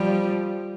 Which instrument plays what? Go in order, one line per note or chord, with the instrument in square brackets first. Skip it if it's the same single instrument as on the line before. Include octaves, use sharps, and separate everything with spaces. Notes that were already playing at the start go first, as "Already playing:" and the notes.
Already playing: [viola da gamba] F3 G3